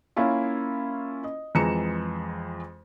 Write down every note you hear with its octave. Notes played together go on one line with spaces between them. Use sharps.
A#3 C#4 E4 F4
D#5
F2 E3 G#3 A#5 C#7 E7